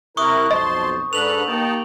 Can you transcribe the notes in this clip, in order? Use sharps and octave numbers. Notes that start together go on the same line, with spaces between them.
C3 E4 A#4 C#6 D#6 F#6
B1 F2 C5 D#5 A5 C6
G#2 D4 A4 B4 F#6 F7 F#7
A#3 D#4 G4 G5 A5